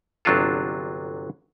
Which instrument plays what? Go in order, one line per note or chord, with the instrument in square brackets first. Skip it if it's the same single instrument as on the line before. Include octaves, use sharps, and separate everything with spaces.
[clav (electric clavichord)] G1 C3 F#3 D4 F4 A4